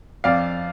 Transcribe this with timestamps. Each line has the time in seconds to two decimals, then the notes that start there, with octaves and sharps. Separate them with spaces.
0.24 F2 D5 F5